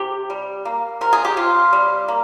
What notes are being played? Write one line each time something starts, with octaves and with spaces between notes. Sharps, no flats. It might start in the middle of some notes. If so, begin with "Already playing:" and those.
Already playing: C3 G4
G3
A#3
C3 A#4
G#4
G4
C3 F4
G3
A#3